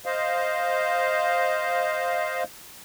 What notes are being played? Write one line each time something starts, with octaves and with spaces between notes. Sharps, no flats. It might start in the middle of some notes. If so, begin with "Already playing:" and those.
C5 D#5 F5